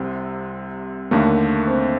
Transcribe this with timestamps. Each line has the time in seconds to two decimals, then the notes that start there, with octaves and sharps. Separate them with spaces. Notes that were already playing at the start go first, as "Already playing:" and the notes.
Already playing: C2 C3 C4
1.11 D#2 D3 A3 A#3
1.67 C4